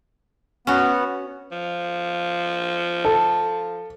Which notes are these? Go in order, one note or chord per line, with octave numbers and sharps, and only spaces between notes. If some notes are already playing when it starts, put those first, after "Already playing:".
B3 C#4 F#4
F3
A4